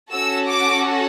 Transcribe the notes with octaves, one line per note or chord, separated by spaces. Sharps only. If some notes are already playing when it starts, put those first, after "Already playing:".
C#4 F#4 A4 E6
D6